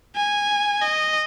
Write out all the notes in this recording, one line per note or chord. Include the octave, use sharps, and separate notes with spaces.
G#5
D#5